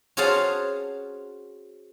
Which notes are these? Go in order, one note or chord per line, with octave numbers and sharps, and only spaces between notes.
C#4 F#4 G#4 C5 F5 A5